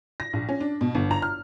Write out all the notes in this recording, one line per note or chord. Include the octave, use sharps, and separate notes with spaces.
A#6
A#1
C#4
D4
B2
G1
A#5
F6